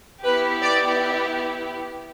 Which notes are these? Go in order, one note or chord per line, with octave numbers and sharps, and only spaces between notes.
B3 E4 G4 B4
D5